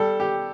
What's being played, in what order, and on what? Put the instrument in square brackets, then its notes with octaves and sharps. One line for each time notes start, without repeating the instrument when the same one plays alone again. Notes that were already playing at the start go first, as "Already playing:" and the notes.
Already playing: [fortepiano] G3 [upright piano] A4
[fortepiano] G4